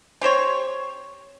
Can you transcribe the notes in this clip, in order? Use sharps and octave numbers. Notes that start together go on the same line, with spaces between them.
C4 G4 C5 C#5